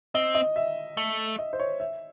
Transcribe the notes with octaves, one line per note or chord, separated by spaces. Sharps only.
C4 D#5
D#5
E5
A3
D#5
C5
C#5
E5